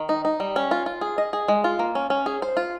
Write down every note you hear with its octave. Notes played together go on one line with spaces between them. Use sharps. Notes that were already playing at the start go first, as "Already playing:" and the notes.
Already playing: D#3
D#4
D#4
G3
C#4
F4
F4
G#4
D#5
G#4
G#3
F4
A#3
C#4
C#4
G#4
C5
F4